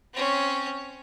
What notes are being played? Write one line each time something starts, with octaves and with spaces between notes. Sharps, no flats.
C4 C#4